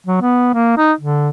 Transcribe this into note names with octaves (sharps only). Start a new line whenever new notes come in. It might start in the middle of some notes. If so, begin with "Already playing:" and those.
F#3
B3
A#3
D#4
D3